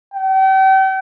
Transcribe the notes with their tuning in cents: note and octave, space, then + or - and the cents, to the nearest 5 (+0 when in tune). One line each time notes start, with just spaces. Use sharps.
G5 -40